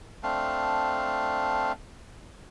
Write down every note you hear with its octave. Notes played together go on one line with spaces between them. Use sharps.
A3 C4 D4 F5